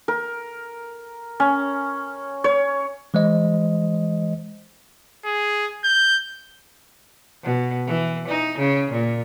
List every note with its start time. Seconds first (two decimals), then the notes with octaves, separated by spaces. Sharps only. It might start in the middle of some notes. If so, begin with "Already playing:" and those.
0.08 A#4
1.40 C#4
2.44 C#5
3.14 E3 G#3 C5 D#5
5.25 G#4
5.84 G6
7.43 B2
7.86 E3
8.28 D#4
8.58 C#3
8.92 A#2